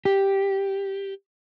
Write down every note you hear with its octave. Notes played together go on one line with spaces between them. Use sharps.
G4